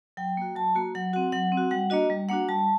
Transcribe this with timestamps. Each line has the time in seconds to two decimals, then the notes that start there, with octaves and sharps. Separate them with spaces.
0.17 F#3 G5
0.37 A#3 F#4
0.55 F#3 A5
0.75 A#3 F#4
0.95 F#3 F#5
1.13 C4 F#4 F#5
1.32 F#3 F#5
1.52 C4
1.57 F#4
1.71 G3 F#5
1.90 A#3 D4 F#4 D#5
2.10 G3
2.29 A#3 D4 F#4 F#5
2.49 G3 A5